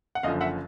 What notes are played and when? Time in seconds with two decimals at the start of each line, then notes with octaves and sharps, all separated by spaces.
0.15 F#5
0.23 F#1 F#2 D3 F3 D#5 F5
0.41 E5 F#5